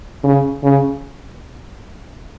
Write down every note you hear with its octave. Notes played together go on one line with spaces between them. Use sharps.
C#3
C#3